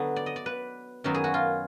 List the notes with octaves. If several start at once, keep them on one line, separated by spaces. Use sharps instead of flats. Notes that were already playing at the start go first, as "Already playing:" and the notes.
Already playing: D3 F#3 B3 B4
D5
D#5
D5
B4
F#2 D#3 F#3 B3 A#4
G#4
F#4
F4